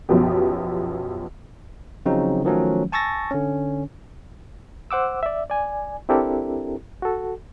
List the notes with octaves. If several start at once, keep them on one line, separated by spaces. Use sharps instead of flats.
B1 F#2 F3 B3 G4
C#3 F3 F#3 C4 D#4
D#3 F3 F#3 A3 C#4
G#5 A5 C#6 E6 A6 A#6
D3 C#4
C5 F#5 D6 E6
D5 E5
D5 G#5
C4 D4 E4 G4 A4 A#4
F#4 A4